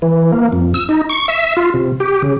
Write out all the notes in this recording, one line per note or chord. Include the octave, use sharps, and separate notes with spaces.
E3
A#3
F2
E6
D#4
C#6
E5
F4
C3
G4
C#3